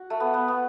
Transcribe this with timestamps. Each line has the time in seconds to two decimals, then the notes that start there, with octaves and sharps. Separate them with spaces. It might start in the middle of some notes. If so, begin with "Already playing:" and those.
Already playing: F#4
0.10 A3
0.20 B3
0.34 B3
0.48 B3